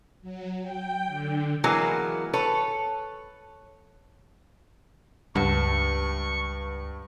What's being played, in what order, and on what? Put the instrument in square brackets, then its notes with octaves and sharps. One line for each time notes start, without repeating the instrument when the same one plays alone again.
[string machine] F#3
G5
D3
[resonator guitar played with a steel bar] E3 F#3 G#3 A#3 B3
A4 B4 C#5
[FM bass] C#2 [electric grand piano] G2 [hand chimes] B4 F#5 A5 [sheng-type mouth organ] C#6